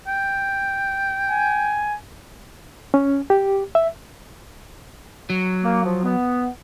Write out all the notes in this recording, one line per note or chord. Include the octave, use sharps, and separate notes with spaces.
G5
G#5
C#4
G4
E5
F#3
A#3
F3
B3